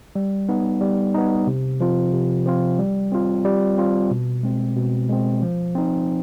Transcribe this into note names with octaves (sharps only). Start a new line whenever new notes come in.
G3
B3 D#4
G3
B3 D#4
C3
F3 C4 F4
C3
F3 C4 F4
G3
C4 F4
G3
C4 F4
B2
G#3 C4
B2
G#3 C4
F3
C4 D#4